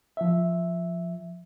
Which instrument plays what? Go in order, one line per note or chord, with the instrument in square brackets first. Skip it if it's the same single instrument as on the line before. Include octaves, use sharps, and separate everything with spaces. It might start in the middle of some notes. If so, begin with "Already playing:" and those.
[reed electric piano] F3 E5